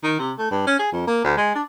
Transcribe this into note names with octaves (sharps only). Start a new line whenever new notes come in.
D#3
C3
A3
G2
C#4
G#4
F2
A#3
D2
G#3
D4